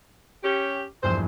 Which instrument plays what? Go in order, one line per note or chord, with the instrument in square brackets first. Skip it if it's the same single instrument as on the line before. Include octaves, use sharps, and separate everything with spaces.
[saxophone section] C#4 G4
[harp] A#1 E2 G2 [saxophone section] C5